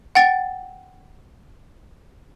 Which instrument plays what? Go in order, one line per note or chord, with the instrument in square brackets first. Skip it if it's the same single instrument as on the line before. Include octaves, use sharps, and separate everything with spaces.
[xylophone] F#5 G5 A6